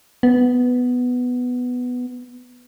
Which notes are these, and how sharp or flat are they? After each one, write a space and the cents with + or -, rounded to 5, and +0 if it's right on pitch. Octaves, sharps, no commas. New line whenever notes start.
B3 +5